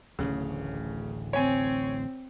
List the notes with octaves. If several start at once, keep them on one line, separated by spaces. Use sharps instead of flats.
D1 A1 D2 C#3
C4 C#5 G#5